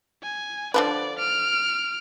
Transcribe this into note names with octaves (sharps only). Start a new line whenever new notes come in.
G#5
D3 F3 B4 D5
F6 D7